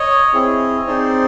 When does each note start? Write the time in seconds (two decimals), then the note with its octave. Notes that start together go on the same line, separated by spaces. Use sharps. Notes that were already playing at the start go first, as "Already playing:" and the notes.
Already playing: C#5 D#5
0.34 C4 E4 G#4
0.87 C4 D#4 G#4 C5 D5